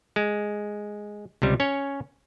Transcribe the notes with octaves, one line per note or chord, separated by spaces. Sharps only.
G#3
C#2 C3 G3
C#4 C#5